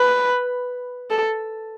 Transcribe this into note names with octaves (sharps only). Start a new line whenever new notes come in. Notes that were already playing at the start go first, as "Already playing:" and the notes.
Already playing: B4
A4